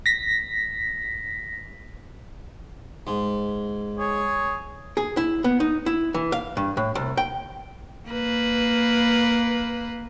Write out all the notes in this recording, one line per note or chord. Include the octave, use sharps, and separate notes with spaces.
A#6 B6
G#2
G#4 C#5
G#4
E4
B3
D#4
E4
E3
F5
G2
A2
C2
G5
A#3 B4